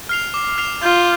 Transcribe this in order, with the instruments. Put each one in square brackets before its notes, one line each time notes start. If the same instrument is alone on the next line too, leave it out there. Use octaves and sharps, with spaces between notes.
[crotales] F6 C7 F7
D6
F6 C7 F7
[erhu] F4 [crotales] G6